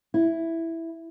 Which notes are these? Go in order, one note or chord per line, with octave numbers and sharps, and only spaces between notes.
E4